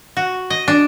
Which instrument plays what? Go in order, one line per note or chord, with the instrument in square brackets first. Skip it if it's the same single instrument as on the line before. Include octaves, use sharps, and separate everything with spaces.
[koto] F#4
D#5
D4